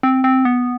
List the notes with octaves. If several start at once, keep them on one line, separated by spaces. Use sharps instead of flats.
C4
C4
B3